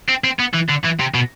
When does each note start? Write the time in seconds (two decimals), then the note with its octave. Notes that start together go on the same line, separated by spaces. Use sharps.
0.09 C4
0.24 C4
0.39 B3
0.53 E3
0.69 D3
0.84 E3
0.99 C3
1.14 B2